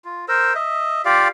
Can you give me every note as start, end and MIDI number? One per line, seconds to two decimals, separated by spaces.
0.05 0.25 65
0.28 0.54 70
0.28 0.54 72
0.28 0.54 88
0.55 1.02 75
0.55 1.02 76
1.05 1.28 65
1.05 1.28 67
1.05 1.28 74
1.05 1.28 77